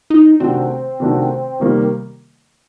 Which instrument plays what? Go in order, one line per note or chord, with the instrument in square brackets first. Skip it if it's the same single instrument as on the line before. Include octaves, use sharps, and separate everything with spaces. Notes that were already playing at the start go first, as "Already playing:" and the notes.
[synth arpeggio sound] D#4
[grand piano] C3 D#3 A3 D4 F#4 [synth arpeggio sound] C4
[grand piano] C3 D#3 A3 D4 F#4
C3 D#3 G3 A#3